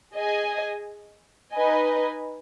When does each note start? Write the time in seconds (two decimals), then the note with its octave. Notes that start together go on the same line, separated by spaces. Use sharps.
0.14 G#4 D#5 G#5
1.54 D#4 B4 D#5 G#5